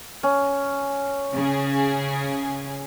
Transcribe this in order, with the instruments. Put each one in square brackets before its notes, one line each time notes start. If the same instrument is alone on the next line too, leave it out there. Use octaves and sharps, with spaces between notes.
[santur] C#4
[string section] C#3 G#4